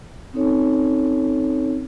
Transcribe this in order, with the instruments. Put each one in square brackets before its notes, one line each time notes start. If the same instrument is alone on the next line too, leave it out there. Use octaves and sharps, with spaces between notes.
[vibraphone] C4 C#4 D#4 A4 C#5